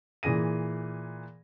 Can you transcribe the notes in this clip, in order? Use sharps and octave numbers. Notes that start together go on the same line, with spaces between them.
A#2 E3 G#4 A#6 D#7